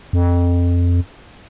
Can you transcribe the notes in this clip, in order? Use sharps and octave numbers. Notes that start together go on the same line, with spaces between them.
F2